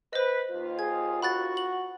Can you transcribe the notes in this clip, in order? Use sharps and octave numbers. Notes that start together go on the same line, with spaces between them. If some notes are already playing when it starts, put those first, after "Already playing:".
B4 C5 D#5
D#2 F4
G#4 G#6
F#4 B5 F#6 A6
F#7